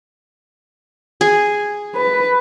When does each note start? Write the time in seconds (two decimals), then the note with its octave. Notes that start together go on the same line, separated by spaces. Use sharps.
1.21 G#4
1.95 B4